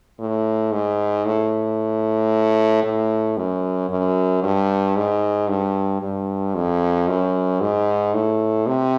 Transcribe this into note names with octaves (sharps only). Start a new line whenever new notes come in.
A2
G#2
A2
A2
F#2
F#2
G2
G#2
G2
G2
F2
F#2
G#2
A2
C3